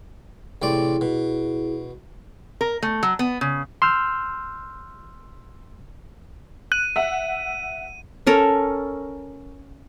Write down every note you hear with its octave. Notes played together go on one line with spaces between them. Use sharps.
A1 C3 E4 G#4 D5
B2
A#4
A3
F#3
B3
C#3
C6 E6 F6 G6
F#6 D#7
E5 F#5
C#4 A4 A#4